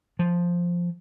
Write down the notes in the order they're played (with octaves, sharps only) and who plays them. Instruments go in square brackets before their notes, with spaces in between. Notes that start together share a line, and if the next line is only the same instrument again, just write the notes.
[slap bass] F3